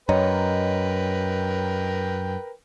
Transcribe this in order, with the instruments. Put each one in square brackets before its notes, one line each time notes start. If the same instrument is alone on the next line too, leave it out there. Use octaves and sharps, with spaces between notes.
[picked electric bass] F#2 [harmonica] A#4 B4 G5 [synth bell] C#5 D#5 A#5